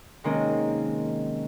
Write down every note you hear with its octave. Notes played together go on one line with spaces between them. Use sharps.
C3 D#3 G#3 A#3 C4 C#4